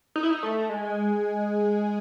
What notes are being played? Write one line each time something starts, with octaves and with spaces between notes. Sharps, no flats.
D#4
E4
D#4
A3
G#3